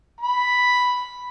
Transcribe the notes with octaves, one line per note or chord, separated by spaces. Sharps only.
B5